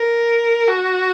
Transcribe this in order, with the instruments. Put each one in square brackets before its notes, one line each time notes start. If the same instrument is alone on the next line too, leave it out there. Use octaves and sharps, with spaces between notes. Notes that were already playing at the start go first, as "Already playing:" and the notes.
Already playing: [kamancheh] A#4
F#4